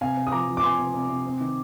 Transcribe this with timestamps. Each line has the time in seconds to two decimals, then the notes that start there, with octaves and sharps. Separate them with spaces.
0.01 C3 F5 G#5
0.17 C3
0.27 D#6
0.32 F3 A#5 D6
0.48 F3
0.57 D6
0.63 C3 G#5 C6
0.79 C3
0.94 C3
1.09 C3
1.26 C4
1.40 D#3